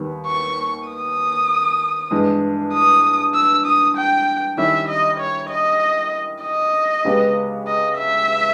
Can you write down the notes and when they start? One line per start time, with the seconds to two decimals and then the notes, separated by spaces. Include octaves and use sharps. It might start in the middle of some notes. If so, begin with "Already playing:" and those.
Already playing: D#2 D#3 G3 B3
0.27 C#6
0.88 D#6
2.11 G2 E3 G#3 B3
2.74 D#6
3.34 E6
3.66 D#6
3.97 G5
4.58 D#3 G3 C#4 E4 G4 E5
4.88 D#5
5.20 C#5
5.51 D#5
6.43 D#5
7.05 C#2 C#3 G#3 B3 G4
7.67 D#5
7.98 E5